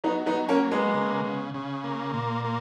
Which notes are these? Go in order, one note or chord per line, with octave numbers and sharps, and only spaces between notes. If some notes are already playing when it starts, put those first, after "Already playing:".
F#3 B3 D#4
B3 D#4
F#3
A#3 C#4
A#3
G#3 B3
C#3
C#3
C#3
A#3
A#2
A#3